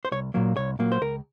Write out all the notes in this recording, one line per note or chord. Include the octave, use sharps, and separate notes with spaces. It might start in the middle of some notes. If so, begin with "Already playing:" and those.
C5
C2 C#5
A#2 F#3 A#3
C2 C#5
A#2 F#3 A#3
C5
C#2 A#4